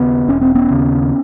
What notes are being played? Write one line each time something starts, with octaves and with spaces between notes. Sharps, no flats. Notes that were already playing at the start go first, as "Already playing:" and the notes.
Already playing: D#2 C#3 B3
E1 C#4
C4
B3 C#4
D#2 C#3